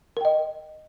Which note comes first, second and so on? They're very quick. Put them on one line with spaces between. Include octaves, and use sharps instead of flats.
A#4 G5 D#5